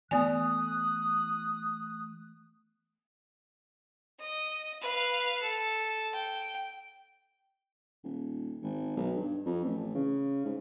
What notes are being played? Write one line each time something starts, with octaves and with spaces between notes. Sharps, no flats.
E3 A3 B3 D5 G#5 D#6 F#6
D#5
B4 F5
A4
G5
D#1
G#1
B1
G2
F2
A1
C#3
G#2